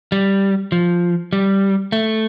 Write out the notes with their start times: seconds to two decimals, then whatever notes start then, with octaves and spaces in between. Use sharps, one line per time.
0.12 G3
0.72 F3
1.33 G3
1.92 A3